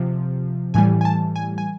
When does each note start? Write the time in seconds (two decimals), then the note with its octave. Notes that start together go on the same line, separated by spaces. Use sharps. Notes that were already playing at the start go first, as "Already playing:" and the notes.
Already playing: C3 F3
0.74 A2 E3 G3 G#5
1.01 G#5
1.05 A5
1.36 G#5
1.58 G#5